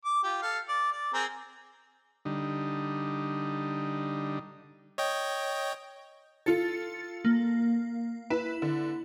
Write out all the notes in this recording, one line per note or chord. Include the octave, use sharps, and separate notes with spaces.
D6
F4 G4
A4 F5
D5
D5
C4 G#4 A#4
D3 G3 D#4
C#5 D#5 G5
F4 A4 A6 C#7
A#3
E4 B4
D3